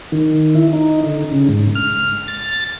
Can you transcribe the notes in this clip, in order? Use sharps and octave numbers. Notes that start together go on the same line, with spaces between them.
D#3
E4
D#4
D3
C#3
G#2
F6
A6